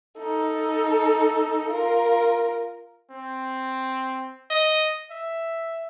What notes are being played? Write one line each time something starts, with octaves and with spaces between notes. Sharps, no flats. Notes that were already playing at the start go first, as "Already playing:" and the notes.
D#4 A4
F4 A#4
C4
D#5
E5